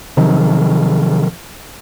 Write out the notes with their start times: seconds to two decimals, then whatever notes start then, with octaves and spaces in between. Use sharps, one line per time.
0.17 C3 D#3 F3 F#3